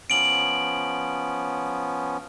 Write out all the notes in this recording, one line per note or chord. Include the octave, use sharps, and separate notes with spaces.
F3 B3 C#4 D7 F#7